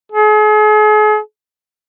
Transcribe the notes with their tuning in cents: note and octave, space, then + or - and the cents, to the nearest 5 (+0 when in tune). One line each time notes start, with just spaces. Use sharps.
G#4 +40